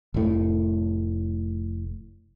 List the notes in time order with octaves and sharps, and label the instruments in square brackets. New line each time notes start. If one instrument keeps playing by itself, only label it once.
[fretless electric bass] F1 A2